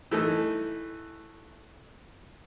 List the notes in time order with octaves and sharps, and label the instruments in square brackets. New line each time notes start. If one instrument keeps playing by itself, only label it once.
[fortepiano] E3 A3 D#4